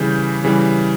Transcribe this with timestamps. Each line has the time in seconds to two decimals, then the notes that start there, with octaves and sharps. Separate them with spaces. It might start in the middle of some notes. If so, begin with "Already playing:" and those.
Already playing: C#3 E3 G3 G6
0.44 C#3 E3 G3